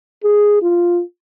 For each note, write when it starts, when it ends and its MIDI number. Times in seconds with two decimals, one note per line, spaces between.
0.24 0.57 68
0.62 1.01 65